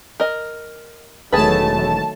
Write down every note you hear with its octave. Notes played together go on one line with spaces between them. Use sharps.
A#4 D#5
E1 D#3 F#3 A3 G#4 B4 A5